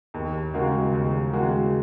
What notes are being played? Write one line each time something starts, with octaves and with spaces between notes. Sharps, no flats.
D#2
C#3 G#3 F#4 A#4
D#2
C#3 G#3 F#4 A#4